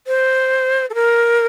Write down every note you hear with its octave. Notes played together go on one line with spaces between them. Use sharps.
C5
A4
A#4